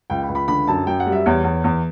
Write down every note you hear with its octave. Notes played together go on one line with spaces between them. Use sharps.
C#2 G5
B5
C#2
B5
D3 B5
F#2 A5
F#2 G5
F#5
G3
E5
E2 C#5
E2
E2